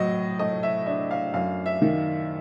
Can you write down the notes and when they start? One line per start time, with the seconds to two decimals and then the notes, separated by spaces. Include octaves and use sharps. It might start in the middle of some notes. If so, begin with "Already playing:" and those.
Already playing: A2 F#3 D#5
0.39 A3 D#5
0.63 E5
0.86 D4 E5
1.11 F5
1.34 F#2 F5
1.66 E5
1.82 D#3